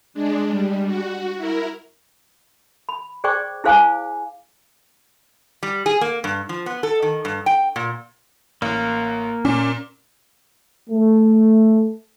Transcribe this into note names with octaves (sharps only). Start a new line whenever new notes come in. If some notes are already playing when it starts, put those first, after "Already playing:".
G#3 D4
G3
F#4
E4 A#4
B5
G#4 C5 D5 G5 C#6 D6
E4 G#4 C5 F5 G#5 D6
G3
G#4
A#3
G2
F3
B3
A4
D#3
G2
G5
A#2
A1 A#3
A#2 C#4
A3